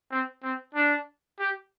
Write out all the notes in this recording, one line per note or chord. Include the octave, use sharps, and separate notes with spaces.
C4
C4
D4
G4